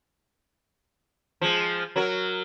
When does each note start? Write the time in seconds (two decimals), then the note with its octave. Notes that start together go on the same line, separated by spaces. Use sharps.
1.41 F3 G#3
1.96 F#3 F#4 A#4